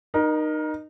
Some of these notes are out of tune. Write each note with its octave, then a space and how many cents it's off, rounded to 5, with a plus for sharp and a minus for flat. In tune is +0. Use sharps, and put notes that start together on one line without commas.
D#4 -20 A#4 +20